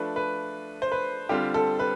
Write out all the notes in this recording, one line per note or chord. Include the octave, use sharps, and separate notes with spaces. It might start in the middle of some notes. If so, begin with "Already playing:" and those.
Already playing: F3 A3 D4 B4
B4
C5
B4
D3 G3 C4 F4 G4
A4
B4